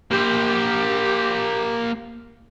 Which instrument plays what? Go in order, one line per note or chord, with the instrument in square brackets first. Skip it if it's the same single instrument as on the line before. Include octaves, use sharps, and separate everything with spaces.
[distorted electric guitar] A#3 C5 [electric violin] G4